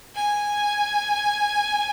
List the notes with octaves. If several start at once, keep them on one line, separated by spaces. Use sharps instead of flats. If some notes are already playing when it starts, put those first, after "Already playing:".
G#5